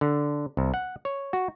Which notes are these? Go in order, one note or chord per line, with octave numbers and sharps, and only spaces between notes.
D3
C2
F#5
C#5
F#4